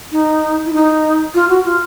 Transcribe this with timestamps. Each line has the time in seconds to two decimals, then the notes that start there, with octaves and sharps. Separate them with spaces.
0.12 D#4
0.66 E4
0.73 D#4
1.34 F4
1.49 F#4
1.65 F4